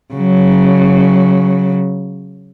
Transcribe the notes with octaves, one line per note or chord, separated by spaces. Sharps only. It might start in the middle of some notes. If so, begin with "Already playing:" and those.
C#3 F#3